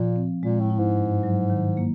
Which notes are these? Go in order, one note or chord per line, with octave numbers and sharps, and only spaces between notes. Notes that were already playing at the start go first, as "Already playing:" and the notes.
Already playing: A#2 F3
C4
A#2 G#3
A2
E4
G#2
G2
F#3
D#3
A#3